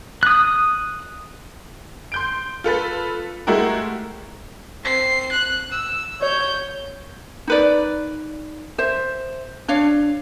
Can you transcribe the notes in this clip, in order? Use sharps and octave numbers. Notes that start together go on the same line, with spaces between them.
D#6 F#6
C6 G6 D7
F4 A4 B4 A6
G#3 A3 E4 F#4 G4 A#4
C4 C7
F#6
E6
C#5 G6
D#4 B4 D5
C5 E5
D4 C#5 F5